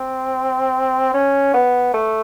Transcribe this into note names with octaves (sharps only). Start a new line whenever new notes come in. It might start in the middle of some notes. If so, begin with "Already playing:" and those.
Already playing: C4
C#4
B3
A3